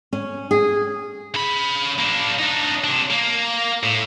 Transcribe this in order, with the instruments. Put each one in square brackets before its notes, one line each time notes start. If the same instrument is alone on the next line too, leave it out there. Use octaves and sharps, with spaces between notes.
[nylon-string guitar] C#4
G#4
[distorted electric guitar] C#3 B5
A#3 D4
D4 D#4
C3 D4
A#3
A2